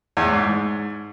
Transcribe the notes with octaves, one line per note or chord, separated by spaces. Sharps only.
E2
A2
G#2